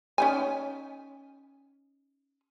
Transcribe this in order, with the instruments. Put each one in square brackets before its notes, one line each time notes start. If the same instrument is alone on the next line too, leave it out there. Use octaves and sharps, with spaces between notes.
[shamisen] C#4 D#4 G#5